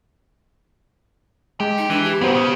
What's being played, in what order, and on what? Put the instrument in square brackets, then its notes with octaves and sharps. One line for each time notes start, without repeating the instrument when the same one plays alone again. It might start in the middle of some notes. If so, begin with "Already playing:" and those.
[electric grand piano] G#3 [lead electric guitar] G4
[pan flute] D#4
[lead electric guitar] E3 [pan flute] D4
[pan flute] G4
[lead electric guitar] G2 A#2 [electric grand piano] B3 F#4 C5
[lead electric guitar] C#3